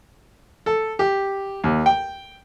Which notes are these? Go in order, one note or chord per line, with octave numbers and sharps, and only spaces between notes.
A4
G4
D#2
G5